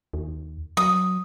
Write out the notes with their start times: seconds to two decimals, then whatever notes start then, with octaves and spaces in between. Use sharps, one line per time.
0.13 D#2
0.77 F#3 D#6